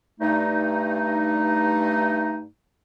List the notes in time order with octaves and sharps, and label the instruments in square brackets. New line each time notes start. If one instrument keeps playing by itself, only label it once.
[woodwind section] G2 A3 D#4